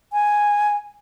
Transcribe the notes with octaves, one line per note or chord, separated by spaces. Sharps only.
G#5